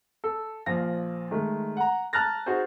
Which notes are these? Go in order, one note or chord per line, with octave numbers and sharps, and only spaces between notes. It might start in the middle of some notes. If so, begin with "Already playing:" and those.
A4
A#1 A#2 F3 F5 A#6
D#3 G#3 A3
F#5 A#5
A5 A#5 F6 F#6 A6 A#6
D#4 F#4 G#4 C5